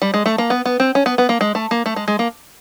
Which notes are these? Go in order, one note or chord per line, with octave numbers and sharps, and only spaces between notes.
G3
G#3
A3
A#3
B3
B3
C4
C#4
B3
B3
A#3
G#3
A3
A#3
A3
G#3
G#3
A#3